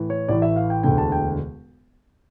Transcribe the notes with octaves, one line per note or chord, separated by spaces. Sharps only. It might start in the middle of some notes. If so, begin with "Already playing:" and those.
Already playing: A2 E3
C#5
A1 A2 E3 D5
E5
F5
G5
E1 D2 D3 G5
A5
G5